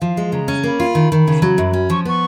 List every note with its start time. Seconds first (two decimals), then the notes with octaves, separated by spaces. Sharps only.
0.01 F3 F5
0.17 G#3
0.32 C#3 A#5
0.48 C#4
0.63 A#3 B5
0.80 F4
0.95 D#3
1.12 D#3
1.28 C#3
1.42 F#3
1.58 F#2
1.73 C#4
1.90 F3 C#6
2.05 B3 C#6